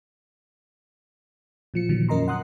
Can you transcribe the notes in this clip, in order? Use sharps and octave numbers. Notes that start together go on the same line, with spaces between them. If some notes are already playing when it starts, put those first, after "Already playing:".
A#2 F3 C#7
A#2 D3 D#3 F3 F#3
F2 C#4 A#4 D#5 A#5 C6
F#5 C6 D#6 F#6